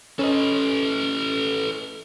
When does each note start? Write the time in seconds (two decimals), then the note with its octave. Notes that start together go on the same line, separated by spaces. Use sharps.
0.19 C#4 A4 B4 D#5